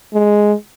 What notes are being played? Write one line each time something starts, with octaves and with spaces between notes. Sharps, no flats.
G#3